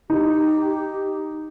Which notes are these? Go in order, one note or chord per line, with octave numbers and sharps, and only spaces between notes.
D#4 G4